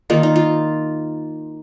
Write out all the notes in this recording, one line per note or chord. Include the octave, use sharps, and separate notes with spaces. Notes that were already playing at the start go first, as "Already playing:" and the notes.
D#3 A#3 D#4 F4
D#4
F4